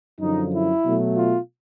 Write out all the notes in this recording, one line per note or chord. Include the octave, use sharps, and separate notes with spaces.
F#2 D3 F3 D#4
E4
B2 F#3 A3
F4